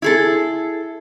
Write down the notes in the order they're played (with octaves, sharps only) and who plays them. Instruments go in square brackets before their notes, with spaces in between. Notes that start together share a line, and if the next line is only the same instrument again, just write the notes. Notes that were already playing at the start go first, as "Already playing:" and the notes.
[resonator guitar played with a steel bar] E4 G#4 A4